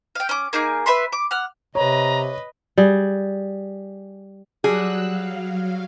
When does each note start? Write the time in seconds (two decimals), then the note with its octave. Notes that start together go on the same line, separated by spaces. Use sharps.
0.15 F5 G5
0.29 C#4 D6
0.53 A#3 D#4 G#4 D6
0.86 B4 E5 B5 C6
1.12 D6
1.31 F#5 F6
1.75 C3 B4 C#5 D#5 A#5
2.78 G3 G#4
4.64 F#3 G3 F#4 G#4 E6 F#6
5.08 F#3 F5